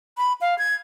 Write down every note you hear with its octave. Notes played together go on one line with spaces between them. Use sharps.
B5
F5
G#6